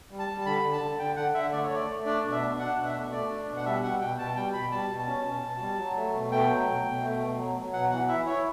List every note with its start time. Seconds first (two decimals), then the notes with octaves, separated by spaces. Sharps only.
0.10 G3
0.19 A5
0.28 G3
0.41 A5
0.46 D3 B5
0.63 D3
0.73 A5
0.81 D3
0.99 D3 G5
1.16 D3 F#5
1.34 D3 E5
1.52 A3 D5
1.64 C#5
1.70 A3 D5
1.88 A3
2.05 D4 D5
2.23 B2
2.32 E5
2.41 D4
2.59 D4 F#5
2.76 B2
2.85 E5
2.94 A3
3.12 A3 D5
3.30 D4
3.47 B2
3.57 F#5
3.65 G3 E5
3.83 G3 F#5
4.00 B2 G5
4.18 B2 A5
4.36 G3 G5
4.53 B2 B5
4.71 G3 A5
4.89 B2
4.99 A5
5.07 C#4
5.25 B2
5.42 B2
5.60 G3
5.78 F#3
5.96 A3
6.14 B2
6.31 A3 G5
6.49 F#3
6.67 B2
6.85 B2
7.03 A3
7.20 B2
7.38 F#3
7.55 F#3
7.73 B2 F#5
7.91 E3 F#5
8.08 E4 E5
8.26 E4 C#5